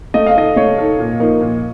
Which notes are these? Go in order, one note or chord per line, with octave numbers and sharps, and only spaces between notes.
A3 D#5
F5
D#4 A4 D#5
A3 C#5
D#4 A4
A#2
F3 A#3 D#4
A#2